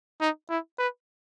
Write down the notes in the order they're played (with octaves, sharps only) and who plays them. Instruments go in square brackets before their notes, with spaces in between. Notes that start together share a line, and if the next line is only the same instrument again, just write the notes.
[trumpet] D#4
E4
B4